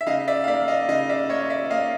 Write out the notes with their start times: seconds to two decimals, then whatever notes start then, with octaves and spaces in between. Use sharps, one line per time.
0.01 E5
0.07 C#3 D#5 F5
0.28 D5 E5
0.44 F5
0.48 A#3 D5 E5
0.68 D#5 F5
0.88 C#3 D#5 F5
1.09 D5 E5
1.29 A#3 C#5 D#5
1.50 D5 E5
1.70 A#3 D#5 F5